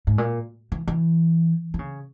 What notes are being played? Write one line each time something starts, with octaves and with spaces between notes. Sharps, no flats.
G#2
A#2
E3
E3
E3
C#3